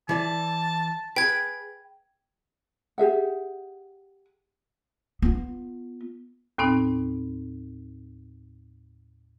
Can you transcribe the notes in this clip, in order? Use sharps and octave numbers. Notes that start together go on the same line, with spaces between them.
E3 D5 A5
G#4 B4 G5 G#6
G4 G#4 E5 F#5
B3 F4
D#2 A2 B3 C4 D#4